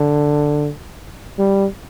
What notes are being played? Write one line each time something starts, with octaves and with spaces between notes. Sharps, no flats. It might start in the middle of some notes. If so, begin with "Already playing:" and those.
Already playing: D3
G3